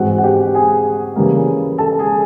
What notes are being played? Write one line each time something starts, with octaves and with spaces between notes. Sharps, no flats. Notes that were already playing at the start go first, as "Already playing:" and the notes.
Already playing: G#2 E3 G#3 C4 F#4 F#5
F#5
G4 G5
G#4 G#5
C#3 E3 G3 A#3
A4 A5
G#4 G#5